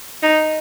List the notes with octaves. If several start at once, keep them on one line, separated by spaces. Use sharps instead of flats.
D#4